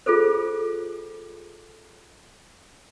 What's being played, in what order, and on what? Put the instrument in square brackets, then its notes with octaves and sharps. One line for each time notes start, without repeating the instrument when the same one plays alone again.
[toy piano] F4 G#4 A4 C5